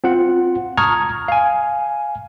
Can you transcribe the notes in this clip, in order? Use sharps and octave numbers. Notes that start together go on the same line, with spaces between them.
C4 F4 F#5
A5 A#5 C#6 D#6 F6 G#6
F5 G#5